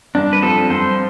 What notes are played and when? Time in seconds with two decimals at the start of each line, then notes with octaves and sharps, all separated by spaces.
0.15 G2 D4
0.33 B4
0.42 F3 C4 A4
0.70 G2 C5